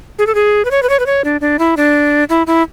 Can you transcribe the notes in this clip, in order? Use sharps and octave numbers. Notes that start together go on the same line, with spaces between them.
G#4
A4
G#4
B4
C#5
B4
C#5
B4
C#5
D4
D4
E4
D4
E4
E4